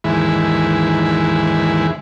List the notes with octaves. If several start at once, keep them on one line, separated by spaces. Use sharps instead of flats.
D#2 G#2 E3 G#3 E4 B5